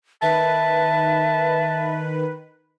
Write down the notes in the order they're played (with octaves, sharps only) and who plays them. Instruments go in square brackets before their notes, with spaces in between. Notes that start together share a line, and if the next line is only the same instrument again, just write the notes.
[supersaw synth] D#3 B4 [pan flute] E5 [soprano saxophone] A5